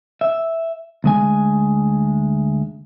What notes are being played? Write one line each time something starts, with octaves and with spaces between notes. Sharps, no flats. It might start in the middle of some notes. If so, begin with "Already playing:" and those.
E5
D2 G#3 G#5